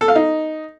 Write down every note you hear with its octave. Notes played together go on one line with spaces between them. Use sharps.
A4
F5
D#4